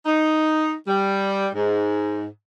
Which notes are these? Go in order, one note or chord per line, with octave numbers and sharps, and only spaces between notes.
D#4
G3
G#2